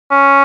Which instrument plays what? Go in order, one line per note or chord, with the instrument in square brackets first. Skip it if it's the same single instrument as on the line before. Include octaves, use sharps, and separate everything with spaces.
[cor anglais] C#4